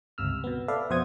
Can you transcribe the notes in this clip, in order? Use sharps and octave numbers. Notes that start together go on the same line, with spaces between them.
G1 C#2 C3 E6 F6
B2 B3
A4 B4 D5 E5 F5
F2 B2 C5 F#5 D#6 G#6